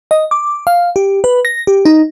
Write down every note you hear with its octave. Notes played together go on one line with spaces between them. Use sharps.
D#5
D6
F5
G4
B4
A#6
G4
D#4